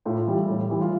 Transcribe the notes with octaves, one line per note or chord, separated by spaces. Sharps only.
A2 F4
E3 G3
A2
E3 G3
F4